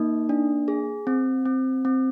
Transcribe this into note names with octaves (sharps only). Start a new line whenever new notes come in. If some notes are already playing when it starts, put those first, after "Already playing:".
Already playing: A#3 D#4
D4
G#4
C4
C4
C4